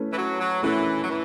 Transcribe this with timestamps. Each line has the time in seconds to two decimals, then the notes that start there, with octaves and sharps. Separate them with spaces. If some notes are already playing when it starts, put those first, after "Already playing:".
Already playing: A3 C#4 E4 B4
0.11 E3
0.17 F#3
0.40 F#3
0.63 E3 A3 C#4 E4 B4
1.03 F#3
1.09 E3